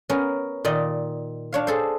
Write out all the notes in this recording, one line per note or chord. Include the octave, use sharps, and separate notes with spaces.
B3 C#4 A#4
A#2 D#3 D5 D#5
D4 C#5 F5
G#4 A4 C5